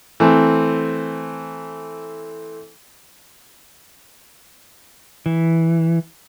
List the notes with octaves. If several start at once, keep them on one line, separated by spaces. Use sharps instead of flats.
E3 A3 C4
E3